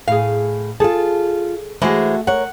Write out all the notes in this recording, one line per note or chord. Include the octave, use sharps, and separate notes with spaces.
A2 G#4 F5
F4 G#4 A4 A5
E3 G#3 A3 F#4 G#4 C5
A#4 C#5 F#5